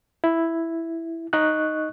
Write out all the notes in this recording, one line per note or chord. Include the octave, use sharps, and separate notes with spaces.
E4
D#4 D#5 C#6 F#6